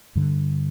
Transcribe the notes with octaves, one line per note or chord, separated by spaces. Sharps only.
G2 D3